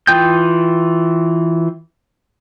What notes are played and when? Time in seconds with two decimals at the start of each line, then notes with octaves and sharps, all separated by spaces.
0.07 E3 F4 G5 D#6 G6